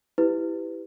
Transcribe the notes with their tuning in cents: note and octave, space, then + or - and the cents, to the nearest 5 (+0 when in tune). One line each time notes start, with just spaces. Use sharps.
E4 +0 G4 +0 B4 +25